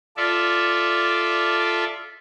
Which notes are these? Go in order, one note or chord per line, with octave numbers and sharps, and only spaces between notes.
F4 A4 D5 E5